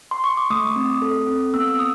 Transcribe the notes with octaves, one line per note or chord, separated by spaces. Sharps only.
C6
C#6
D6
A3 D#6
C4
A4
C4
B3 E6
E6
D#6